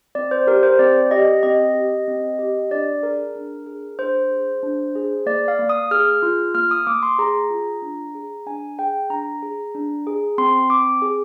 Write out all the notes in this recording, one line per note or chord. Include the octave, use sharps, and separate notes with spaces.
C4 D5
C5
G4 A#4
C5
C4 D5
G4 D#5
C4 D#5
G4
C4
G4
D4 D5
G#4 A#4
D4
G#4
D4 C5
G#4
D4
G#4
A#3 D5
F5
A#3
D#6
G#4 F6
F4
A#3 F6
D#6
A#3 D6
C6
G#4 A#5
F4
D4
G#4
D4 G#5
G#4 G5
D4 A#5
G#4
D4
G#4
C4 C6
C4 D6
G#4